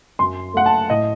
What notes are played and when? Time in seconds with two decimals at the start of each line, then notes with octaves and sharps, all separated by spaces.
0.19 F#2 C6
0.54 A3 F#5
0.66 A5
0.90 A2 D#5